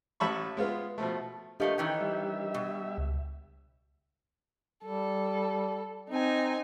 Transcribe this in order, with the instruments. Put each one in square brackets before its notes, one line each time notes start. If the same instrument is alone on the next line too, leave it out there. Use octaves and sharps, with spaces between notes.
[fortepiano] A1 E5 A5 B5 C#6
G#3 B3 F4
B2 F3 A3
[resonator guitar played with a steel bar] F3 A3 A#3 [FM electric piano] D4 G4 D#5
[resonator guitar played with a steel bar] D#3 E3 C#4 [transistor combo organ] G5
[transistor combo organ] G3 E5
[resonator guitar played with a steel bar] B2
[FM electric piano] C#2
[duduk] G3 [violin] A4
[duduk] C4 [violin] D#4 G#5